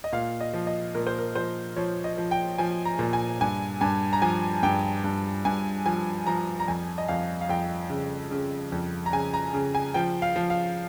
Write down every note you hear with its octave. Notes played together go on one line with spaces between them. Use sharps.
D#5
A#2 F5
D#5
F3
D#5
A#2 A#4
C5
A#4
F3 C5
F3 C#5
D#5
F3
G5
F3 G#5
A#5
A#2
G#5
G2 G#5
G2 G#5
A#5
F3 G#5
G2 G5
G2
G2 G#5
F3 G#5
F3 A#5
A#5
F2 G#5
D#5
F2 F5
F5
F2 G5
C#3
C#3
F2
A#5
C#3 G#5
A#5
C#3
G#5
F3 G5
F5
F3
F5